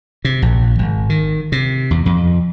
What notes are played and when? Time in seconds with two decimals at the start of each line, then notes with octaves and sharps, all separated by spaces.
0.25 C3
0.42 A#1
0.79 G#1
1.10 D#3
1.52 C3
1.91 E2
2.06 F2